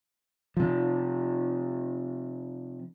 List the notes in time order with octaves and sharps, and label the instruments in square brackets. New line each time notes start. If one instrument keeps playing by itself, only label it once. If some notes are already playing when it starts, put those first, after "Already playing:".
[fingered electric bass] C3 F3